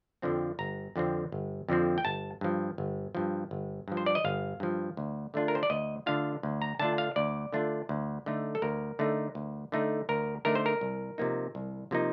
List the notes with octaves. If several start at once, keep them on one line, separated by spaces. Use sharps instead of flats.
F2 D3 F3 C4
G1 A#5
F2 D3 F3 C4
G1
F2 D3 F3 C4
G5
G1 A5
G2 F3
G1
G2 F3
G1
G2 F3
C5
D5
D#5
G1 F5
G2 F3
D2
D3 A3 D4 F4
A#4
C5
D5
D2 D#5
D3 A3 D4 F4 F5
D2
A#5
D3 A3 D4 F4 A5
F5
D2 D5
D3 A3 D4 F4
D2
D3 A3 D#4
A4
D2 A#4
D3 A3 D#4
D2
D3 A3 D#4
D2 A#4
D3 A3 D#4 A#4
C5
A#4
C2
C3 F3 A#3 D#4
C2
C3 F3 A#3 D#4